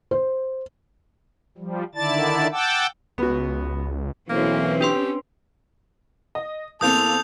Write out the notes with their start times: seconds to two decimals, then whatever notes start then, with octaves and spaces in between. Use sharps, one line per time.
0.11 C5
1.58 F3 G3
1.95 D3 D#3 E4 D5 A5 A6
2.52 F#5 G5 A5 D6 E6
3.18 C#2 B3 F#4
4.30 B1 E3 A#3 C4 C#4
4.81 D4 G4 B4 C6
6.35 D#5
6.81 E2 A#3 C4 A4 D#6 G6 F7